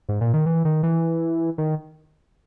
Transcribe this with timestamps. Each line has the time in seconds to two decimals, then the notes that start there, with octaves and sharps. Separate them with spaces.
0.09 G#2
0.21 A#2
0.34 D#3
0.46 E3
0.65 D#3
0.83 E3
1.58 D#3